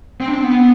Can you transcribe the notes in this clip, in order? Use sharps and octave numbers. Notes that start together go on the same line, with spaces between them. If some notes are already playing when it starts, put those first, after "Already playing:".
C4
D4
C4
B3